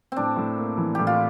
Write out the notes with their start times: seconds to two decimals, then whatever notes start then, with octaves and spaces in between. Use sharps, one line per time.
0.12 A2 C4 D4
0.36 A2
0.57 A#3
0.77 E3
0.95 A2 G4
1.07 F4